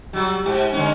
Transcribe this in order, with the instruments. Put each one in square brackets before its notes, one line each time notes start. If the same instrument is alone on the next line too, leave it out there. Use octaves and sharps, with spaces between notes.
[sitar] F#3 G3
G#2 G4
D3 G#3 C#4